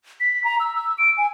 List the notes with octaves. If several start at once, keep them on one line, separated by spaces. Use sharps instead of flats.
B6
A#5
E6
E6
D7
G#5